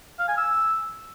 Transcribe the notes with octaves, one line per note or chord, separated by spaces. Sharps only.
F5
G#5
E6